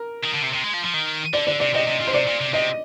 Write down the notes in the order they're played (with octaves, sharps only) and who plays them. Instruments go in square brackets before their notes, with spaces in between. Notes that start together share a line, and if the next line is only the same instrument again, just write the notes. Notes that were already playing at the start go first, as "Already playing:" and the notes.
Already playing: [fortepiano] A#4
[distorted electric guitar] D#3
D3
C3
C3
G#3
F3
F3
D#3
[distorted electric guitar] D3 [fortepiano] D5
[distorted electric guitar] D3 [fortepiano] D5
[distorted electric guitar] C3 [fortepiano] D5
[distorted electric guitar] C3 [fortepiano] D#5
[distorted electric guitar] C3
A#2
[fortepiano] C5
[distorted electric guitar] C3 [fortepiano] D5
[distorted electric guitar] A#2
C3
[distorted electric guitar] C3 [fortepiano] D#5